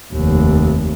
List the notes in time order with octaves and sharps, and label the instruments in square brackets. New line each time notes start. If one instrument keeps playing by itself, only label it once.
[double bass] F1 D#2